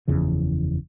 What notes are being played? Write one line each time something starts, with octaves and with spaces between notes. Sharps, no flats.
F#1 E2 C#3 F3